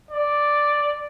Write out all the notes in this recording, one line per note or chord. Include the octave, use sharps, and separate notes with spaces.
D5